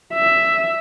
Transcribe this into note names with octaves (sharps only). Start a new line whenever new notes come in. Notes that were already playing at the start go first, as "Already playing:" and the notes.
E5